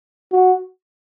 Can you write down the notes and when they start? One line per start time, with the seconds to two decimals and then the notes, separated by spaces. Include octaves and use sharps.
0.32 F#4